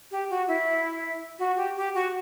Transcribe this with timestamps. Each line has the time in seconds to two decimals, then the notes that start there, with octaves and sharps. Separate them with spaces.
0.11 G4
0.30 F#4
0.48 E4
1.39 F#4
1.57 G4
1.76 G4
1.95 F#4